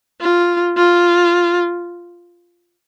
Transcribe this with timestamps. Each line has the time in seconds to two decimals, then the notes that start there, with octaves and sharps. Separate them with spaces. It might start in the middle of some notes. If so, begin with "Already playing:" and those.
0.21 F4
0.77 F4